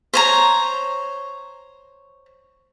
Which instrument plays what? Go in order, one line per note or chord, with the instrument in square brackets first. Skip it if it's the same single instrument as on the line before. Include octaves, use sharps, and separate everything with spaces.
[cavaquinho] C5 C#5 A#5